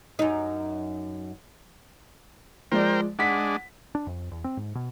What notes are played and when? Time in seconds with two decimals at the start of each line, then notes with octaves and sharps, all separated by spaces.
0.19 F#2 D#4
2.72 F3 G#3 A#4 C5 D5 G5
3.19 G#3 D4 F#5 B6
3.95 D4
4.07 F2
4.31 E2
4.44 C4
4.57 G#2
4.75 B2